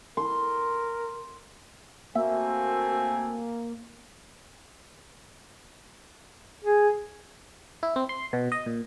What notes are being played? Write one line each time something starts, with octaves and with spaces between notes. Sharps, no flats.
A#4 C6
A3 A#3 C4 F#4 E5 G#5
G#4
E4
C4
C6
B2
D#5
A#2